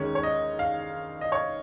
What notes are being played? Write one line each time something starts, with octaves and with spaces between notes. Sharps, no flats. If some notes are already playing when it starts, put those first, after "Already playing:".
Already playing: D#2 D#3 G#3 C#4 C#5
C#5
D#5
F5
D#5
C#5